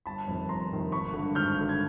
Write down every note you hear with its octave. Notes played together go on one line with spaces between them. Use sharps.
G1 A5 B5
F2 C3 D#3
G1 A#5 C6
F2 C3 D#3
G#1 B5 C#6
G2 D3
G#1 F6 G6
G2 D3
G#6